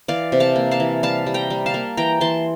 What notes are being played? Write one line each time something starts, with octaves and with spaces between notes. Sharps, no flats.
E3 D5 F5
C3
F5 A5
A#3
F5 A5
E3
G3 F5 A5
G3
G5 A#5
G3
F5 A5
A#3
E3 G5 A#5
E3 A5 C6